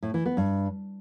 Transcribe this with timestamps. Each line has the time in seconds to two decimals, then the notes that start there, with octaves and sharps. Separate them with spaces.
0.03 A2
0.14 E3
0.26 B3
0.37 G2